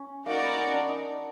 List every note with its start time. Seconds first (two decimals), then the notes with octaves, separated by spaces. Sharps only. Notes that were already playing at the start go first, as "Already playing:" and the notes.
Already playing: C#4
0.26 A#3 D#4 F#4 A#4 D5
0.42 B3
0.58 C#4
0.74 D4
0.89 D#4